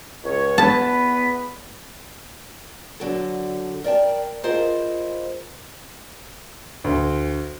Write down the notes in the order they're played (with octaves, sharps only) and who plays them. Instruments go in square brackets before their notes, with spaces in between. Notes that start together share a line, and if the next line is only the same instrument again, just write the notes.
[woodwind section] C#2 C#5
[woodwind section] E2 B3 B5 [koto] A5
[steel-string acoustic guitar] D3 F#3 A4
A#4 D5 G5 A5
E4 F4 G#4 A#4 C5 D#5
[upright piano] D2